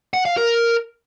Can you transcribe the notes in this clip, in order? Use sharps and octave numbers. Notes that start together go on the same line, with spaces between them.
F#5
F5
A#4